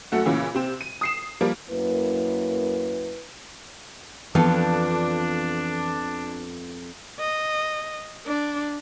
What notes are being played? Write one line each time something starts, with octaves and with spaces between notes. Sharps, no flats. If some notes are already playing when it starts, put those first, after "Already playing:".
F#2 A3 F#5
A#2 C#3 E3 C#4
C3 C4
D#7
D#6 C7 E7
F3 G3 A#3
F#2 A#3 E4 B4
F2 E3 B3 D4 F4 A4
D#5
D4